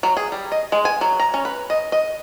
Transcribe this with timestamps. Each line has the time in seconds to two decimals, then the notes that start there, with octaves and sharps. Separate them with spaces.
0.03 F#3
0.17 G#4
0.32 G3
0.52 D#5
0.72 G#3
0.85 G#5
1.01 F#3
1.20 A#5
1.34 C#4
1.45 B4
1.70 D#5
1.92 D#5